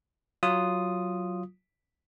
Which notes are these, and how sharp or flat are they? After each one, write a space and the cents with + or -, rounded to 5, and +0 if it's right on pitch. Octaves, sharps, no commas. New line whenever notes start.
F#3 +0 F4 +0 D#6 -5